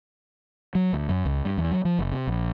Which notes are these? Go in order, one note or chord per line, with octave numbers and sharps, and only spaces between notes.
F#3
D2
F#2
C#2
G2
E2
F#3
F3
F#1
C3
A#1